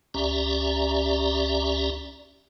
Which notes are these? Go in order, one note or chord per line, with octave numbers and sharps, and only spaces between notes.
C#2 C#4 G4 D5 E5 A#5